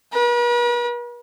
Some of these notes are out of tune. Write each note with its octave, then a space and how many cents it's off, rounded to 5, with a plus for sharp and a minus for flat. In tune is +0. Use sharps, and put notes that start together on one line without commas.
B4 -45